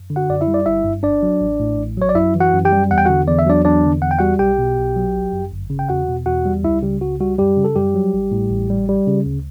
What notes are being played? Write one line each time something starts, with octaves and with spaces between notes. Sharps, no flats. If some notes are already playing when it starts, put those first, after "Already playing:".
Already playing: F#2
D3
F#4 F#5
F#2 D5
E4 E5
G3
D5
G1 E4 E5
G2
G1 D4 D5
F#3
A1
A2
A1
F#3 C#5
D5
F#2 E4 E5
E3
F#4 F#5
F#2
G4 G5
G3
E2 F#5
G5
D3 F#4 F#5
E2 D5
E5
F#3 D4 D5
E2 D4 D5
D3
E2 F#5
G5
G3 F#4 F#5
B1 G4 G5
B2
B1
F#3
G1
F#2
G1
C#3
G5
E2 F#4 F#5
B2
E2 F#4 F#5
G3
C#2 E4 E5
C#3 G3 G4
C#2 F#4
G3 F#4
F#2 G3 G4
C#3
A4
F#2 G3 G4
F#3
A1
A2
A1
G3
G3
C#3
D2